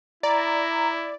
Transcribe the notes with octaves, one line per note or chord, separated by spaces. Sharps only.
E4 D5 A#5